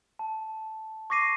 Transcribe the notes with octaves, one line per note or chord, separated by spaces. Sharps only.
A5
C#6 D6 A#6 C7 D#7